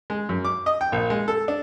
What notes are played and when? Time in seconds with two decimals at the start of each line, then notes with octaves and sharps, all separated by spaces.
0.10 G#3
0.29 F#2
0.45 D6
0.66 D#5
0.81 G5
0.92 A#1
1.10 G#3
1.28 A4
1.48 D4